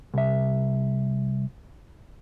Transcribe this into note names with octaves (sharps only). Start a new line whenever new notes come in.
C2 E5